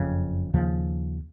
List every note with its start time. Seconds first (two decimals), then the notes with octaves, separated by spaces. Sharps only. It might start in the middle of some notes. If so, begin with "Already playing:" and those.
Already playing: F#1 F2 C#3
0.54 D#2 C#3 F3